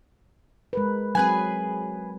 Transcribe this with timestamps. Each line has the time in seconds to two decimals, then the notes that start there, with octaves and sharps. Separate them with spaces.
0.73 G#3 A#4 B4
1.15 F#3 C4 G#4 B4 G#5